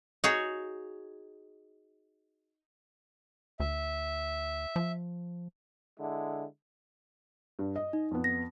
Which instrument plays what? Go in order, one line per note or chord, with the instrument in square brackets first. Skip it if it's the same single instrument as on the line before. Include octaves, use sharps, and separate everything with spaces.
[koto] D#4 F#4 G#4 C#5
[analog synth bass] D2 [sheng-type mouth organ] E5
[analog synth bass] F3
[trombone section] D3 G#3 E4
[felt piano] G2
D#5
[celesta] D#4
[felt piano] F2 B3
[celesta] A#6